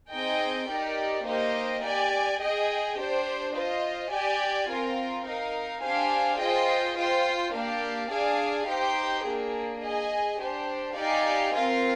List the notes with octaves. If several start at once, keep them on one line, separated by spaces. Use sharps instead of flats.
C4 D#4 G#4 D#5 G5
D#4 G4 A#4 D5
A#3 D#4 G4 C5 D#5
G4 D5 G#5
G#4 D#5 G5
D4 G4 C5
F4 C5 D#5
G4 D5 G#5
C4 F4 A#4
D#4 A#4 F5
D4 G4 C5 F5 G#5
F4 G#4 C5 D#5 G5
F4 C5 G5
A#3 D4 G4 D5 F5
D4 G#4 D5 F5 G#5
D#4 G4 C5 G5
A#3 D4 G#4
G#4 D#5 G#5
D4 G4 C5
D#4 G4 D5 F5 G#5
C4 F4 A#4 F5